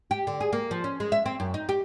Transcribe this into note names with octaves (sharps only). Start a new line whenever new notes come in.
G4
D3
G#4
A#3
F3
C#4
G#3
E5
C4
F#2
D#4
G4